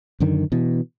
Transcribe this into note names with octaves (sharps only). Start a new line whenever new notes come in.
F#2 D3 D#3
B2 E3